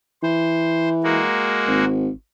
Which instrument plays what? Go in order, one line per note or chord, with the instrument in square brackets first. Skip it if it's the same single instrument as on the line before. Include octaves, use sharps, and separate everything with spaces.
[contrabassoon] E3 [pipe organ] C5
[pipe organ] G#3 A#3 F#4
[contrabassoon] G#1